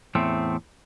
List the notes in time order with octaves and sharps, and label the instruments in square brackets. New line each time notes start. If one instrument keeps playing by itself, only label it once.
[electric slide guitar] E2 A2 A3 C4